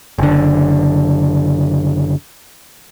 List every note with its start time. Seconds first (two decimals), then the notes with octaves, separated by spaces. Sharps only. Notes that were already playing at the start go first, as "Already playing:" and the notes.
0.18 F#1 D3